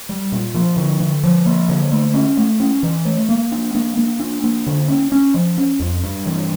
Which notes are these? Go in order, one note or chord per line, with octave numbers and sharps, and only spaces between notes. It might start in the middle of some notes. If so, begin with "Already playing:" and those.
G3
A#2
F3
D3
D3
F3
A#3
D3
A3
C#4
A3
C#4
E3
A3
A#3
D4
A#3
A#3
D4
A#3
D3
C#4
C#4
F3
C#4
F2
G2
E3